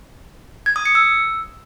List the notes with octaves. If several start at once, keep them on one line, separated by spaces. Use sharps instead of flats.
G#6
D#6
C#7
E6